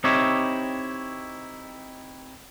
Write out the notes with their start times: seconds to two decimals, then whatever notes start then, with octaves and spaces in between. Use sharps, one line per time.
0.04 C4 D#4 E4 G4 C#5 E5